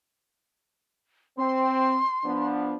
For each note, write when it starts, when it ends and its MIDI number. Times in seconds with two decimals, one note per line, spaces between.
1.38 1.98 60
1.38 2.48 84
2.24 2.77 53
2.24 2.77 59
2.24 2.77 62